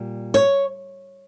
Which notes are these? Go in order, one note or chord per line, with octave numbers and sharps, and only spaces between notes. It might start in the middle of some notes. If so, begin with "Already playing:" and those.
Already playing: A#2 G3
C#5